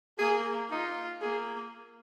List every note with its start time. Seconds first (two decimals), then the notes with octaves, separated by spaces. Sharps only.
0.19 A#3 G#4
0.70 D#4 F4
1.22 A#3 G#4